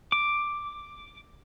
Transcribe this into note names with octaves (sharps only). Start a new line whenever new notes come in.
D6